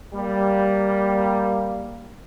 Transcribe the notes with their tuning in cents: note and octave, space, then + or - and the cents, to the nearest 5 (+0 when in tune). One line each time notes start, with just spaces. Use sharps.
G3 +0 A#3 +0